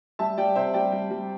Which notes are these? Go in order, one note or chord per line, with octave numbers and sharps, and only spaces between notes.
G3 E5 A5
G3 D5 G5
C3 C5 E5
G3 D5 G5
G3
G3